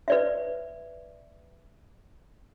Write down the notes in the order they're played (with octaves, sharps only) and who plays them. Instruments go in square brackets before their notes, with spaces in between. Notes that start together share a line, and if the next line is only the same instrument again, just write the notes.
[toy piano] B4 D5 E5